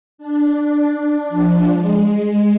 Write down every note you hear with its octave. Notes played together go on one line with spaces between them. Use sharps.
D4
D4
F3
G#3